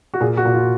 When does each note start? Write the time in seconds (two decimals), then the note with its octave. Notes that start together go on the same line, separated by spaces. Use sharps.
0.14 F#4
0.21 A#2 G#4
0.37 F#4
0.46 A#2
0.54 F4